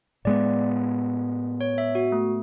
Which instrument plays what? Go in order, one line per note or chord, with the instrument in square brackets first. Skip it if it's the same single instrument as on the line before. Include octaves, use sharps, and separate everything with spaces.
[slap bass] A2 G#3 B3 [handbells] D5
[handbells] C#5
E5
F#4
A3